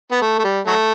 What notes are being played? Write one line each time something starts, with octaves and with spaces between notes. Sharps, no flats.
B3
A3
A3
G3
F#3 A3